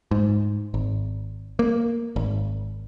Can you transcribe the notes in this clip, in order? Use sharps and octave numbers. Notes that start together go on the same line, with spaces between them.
G#2
G#1
A#3
G#1